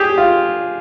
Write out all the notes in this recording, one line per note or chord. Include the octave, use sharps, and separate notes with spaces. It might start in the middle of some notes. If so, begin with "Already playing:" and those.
Already playing: G4 G#4
F4